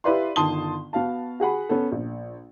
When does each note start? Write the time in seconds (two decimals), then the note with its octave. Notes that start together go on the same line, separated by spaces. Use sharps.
0.04 E4 G4 B4 D5 F5 C6
0.36 G1 D#3 A5 C6 D#6 G7
0.93 B3 F#4 F5 A5
1.40 F#4 G#4 F#5 B5
1.69 B3 C#4 A4
1.92 A#1